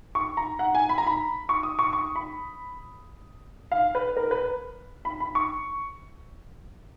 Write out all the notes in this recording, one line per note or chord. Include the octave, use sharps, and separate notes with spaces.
C#6
A#5
F#5
G#5
B5
A#5
B5
C#6
D#6
C#6
C#6
B5
F5
B4
A#4
B4
B5
B5
C#6